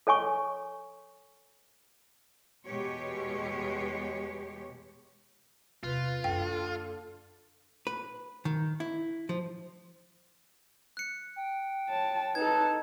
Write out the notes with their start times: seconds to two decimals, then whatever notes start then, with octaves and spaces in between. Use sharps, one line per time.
0.07 A4 C#5 G#5 C#6
2.65 E2 B2 G#3 G4 C#5
5.83 E2 C3 F4 B4
6.24 F#2 D3 A#3 G5
7.87 B4
8.45 D#3
8.80 E4
9.29 F3
10.97 F#6 C#7
11.36 G5
11.89 C#5 A5
12.35 D#4 A4 B4 A5 G#6